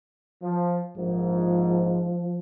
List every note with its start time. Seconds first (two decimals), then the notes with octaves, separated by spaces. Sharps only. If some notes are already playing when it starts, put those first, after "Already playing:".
0.42 F3
0.97 A#1 G#2 F3